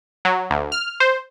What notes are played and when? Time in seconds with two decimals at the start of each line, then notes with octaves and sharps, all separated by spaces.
0.25 F#3
0.50 D2
0.72 F6
1.00 C5